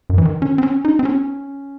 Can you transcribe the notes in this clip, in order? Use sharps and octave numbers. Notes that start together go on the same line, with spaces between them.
F#2
E3
D#3
C#4
C4
C#4
D#4
C4
C#4